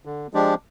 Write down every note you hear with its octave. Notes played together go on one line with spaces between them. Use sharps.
D3
F3 G#3 D4 G4